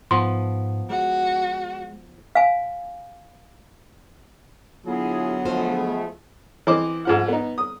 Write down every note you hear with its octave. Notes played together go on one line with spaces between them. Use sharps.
G#2 F3 B3 C6
G#3 F#4
F5 G#5
D3 F#3 B3 E4 F4 G#4
F3 G#3 A3 F4 C5
E3 C4 C5 D#5 D6
G#2 F3 F#5
B3 D#4
D#6